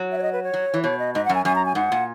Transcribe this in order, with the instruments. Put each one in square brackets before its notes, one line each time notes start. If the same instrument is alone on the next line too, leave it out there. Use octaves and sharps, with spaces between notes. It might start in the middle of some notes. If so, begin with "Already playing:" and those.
Already playing: [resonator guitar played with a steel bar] F#3
[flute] E5
C#5
D#5
B4
C#5
[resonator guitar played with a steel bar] F#3
E3
[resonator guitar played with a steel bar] B2 [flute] C#5
[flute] D#5
[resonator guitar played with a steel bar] G#2 [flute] D#5
[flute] F#5
[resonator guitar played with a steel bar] F#2
[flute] G#5
[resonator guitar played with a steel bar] F#2 [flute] G#5
[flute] A#5
G#5
[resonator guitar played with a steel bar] G#2 [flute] F#5
[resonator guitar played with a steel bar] A#2